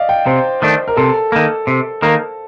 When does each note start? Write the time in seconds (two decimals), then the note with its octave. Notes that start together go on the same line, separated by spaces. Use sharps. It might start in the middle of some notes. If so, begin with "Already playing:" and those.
Already playing: D5 D#5 F5
0.09 G5
0.26 C3 C5
0.62 D#3 A3 D4
0.88 A#4
0.97 C3 A4
1.32 D#3 A#3
1.67 C3
2.02 D#3 A#3